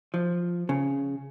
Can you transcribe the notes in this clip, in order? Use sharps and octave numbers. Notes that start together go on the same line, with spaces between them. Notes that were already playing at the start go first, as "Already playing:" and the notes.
F3
C#3